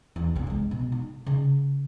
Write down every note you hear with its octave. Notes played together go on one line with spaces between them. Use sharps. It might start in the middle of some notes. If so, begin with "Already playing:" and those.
E2
C2 G2
F3 G#3
B2
D#4
C#3